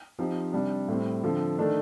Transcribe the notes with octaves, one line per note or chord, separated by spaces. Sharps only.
F3 C4 D#4 G4
C3 G3 D4
A2 G3 C4
D3 F3 C4
D#3 A3 D4